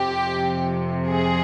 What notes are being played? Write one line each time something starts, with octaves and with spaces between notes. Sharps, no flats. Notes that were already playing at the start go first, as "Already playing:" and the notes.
Already playing: F2 C3 F3 G4
G#4